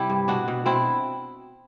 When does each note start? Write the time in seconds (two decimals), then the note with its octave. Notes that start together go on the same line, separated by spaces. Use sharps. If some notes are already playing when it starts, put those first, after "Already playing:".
Already playing: C3 G3 E4 G4
0.10 G2
0.28 B2 D4 F#4
0.48 B2
0.65 B2 C4 E4